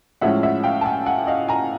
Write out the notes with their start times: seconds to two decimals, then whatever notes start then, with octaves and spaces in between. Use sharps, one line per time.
0.21 A2 F3 G#3 C#4 E4 E5 F#5
0.43 E5 F#5
0.64 F5 G5
0.81 A5
0.85 F#5 G#5
1.06 F#5 G#5
1.27 D#5 F5
1.48 G#5 A#5